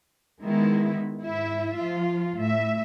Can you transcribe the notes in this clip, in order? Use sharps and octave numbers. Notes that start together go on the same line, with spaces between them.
D#3 G#3 B3 E4
G#2 E4 E5
F3 F4
A2 E5